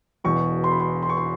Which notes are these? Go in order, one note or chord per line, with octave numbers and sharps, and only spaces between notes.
E1 E2 B2 C#6
C6
B5
C6
C6
C#6
C6